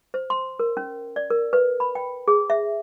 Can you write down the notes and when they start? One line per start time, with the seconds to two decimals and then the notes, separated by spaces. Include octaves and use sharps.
0.14 C5
0.30 C6
0.59 A#4
0.77 C#4
1.16 D5
1.30 A#4
1.53 B4
1.80 B5
1.95 G5
2.28 G#4
2.50 E5